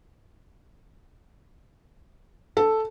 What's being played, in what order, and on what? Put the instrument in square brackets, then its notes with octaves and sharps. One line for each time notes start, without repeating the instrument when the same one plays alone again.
[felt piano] A4